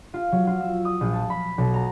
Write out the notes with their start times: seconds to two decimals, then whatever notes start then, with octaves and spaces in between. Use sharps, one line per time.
0.14 F4
0.32 F#3
0.47 F4
0.60 E6
0.85 D#6
1.01 A#1
1.13 A5
1.30 B5
1.58 B1
1.74 A#5